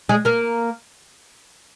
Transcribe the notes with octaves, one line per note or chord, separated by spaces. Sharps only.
G#3 G#4
A#3 A#4